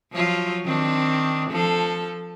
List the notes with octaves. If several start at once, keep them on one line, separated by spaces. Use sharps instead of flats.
F3 F#3 F4
D#3 C4 D4
F3 A4